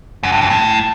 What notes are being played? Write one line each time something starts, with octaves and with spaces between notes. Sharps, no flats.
F#2
G2
F2
A2